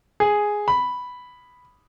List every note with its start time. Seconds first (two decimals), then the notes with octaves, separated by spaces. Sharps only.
0.20 G#4
0.68 B5